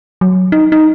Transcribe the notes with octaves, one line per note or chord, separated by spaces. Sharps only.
F#3
D#4
D#4